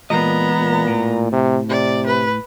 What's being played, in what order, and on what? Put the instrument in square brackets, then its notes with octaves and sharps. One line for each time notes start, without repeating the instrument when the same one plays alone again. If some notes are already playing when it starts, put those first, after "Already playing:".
[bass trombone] A#2 [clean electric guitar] E3 G#3 D#5 [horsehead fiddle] B3 A#5
[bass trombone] A#2
[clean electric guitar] A2
[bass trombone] C3
[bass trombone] C3 [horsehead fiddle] D5
[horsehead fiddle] B4